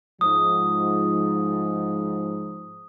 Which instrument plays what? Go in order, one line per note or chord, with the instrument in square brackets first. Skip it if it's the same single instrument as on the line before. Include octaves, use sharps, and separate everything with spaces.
[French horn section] G#2 F3 [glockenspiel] D#6